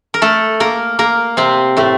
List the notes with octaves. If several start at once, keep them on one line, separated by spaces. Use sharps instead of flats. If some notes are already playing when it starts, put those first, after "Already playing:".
A#4
A3 A4
A#3 A#4
A#3 A#4
C3 C4
A2 A3